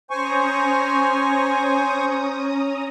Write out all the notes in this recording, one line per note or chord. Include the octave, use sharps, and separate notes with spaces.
C#4 C5 G#5 A#5 C#6 D#6